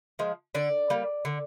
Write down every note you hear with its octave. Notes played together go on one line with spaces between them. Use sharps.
F3 G#3
D3 D5
G3 A#3
D3